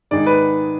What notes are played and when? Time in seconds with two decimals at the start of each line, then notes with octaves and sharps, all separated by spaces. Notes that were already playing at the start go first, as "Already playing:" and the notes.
0.11 G#2 D#3 G#3 D#4 G#4 D5
0.27 B4